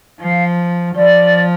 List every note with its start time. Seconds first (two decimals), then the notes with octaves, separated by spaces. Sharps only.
0.20 F3 F5
0.95 F3 D5